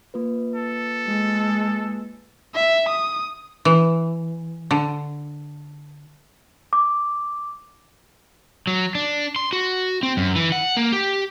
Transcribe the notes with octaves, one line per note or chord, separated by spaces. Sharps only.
A#3 F4 B4
A4
G#3
E5
D#6
E3
D3
D6
F#3
D4
C6
F#4
C4
F#2
E3
F#5
A#3
G4